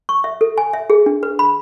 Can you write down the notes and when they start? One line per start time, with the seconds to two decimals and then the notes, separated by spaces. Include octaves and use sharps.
0.09 C#6
0.24 E5
0.41 A4
0.58 G#5
0.73 E5
0.90 G#4
1.06 D4
1.23 B4
1.39 B5